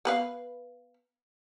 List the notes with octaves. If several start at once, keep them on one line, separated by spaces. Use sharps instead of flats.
B3 B4 F5